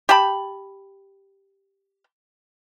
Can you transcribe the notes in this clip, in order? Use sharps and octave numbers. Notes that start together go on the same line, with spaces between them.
G4 G5 A5 B5